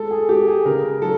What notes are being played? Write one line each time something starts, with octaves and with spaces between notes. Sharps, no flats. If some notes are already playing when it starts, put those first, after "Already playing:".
Already playing: G#3 A4
G#4
G#3 G4
G#4
C#3 A#4
F#3 A4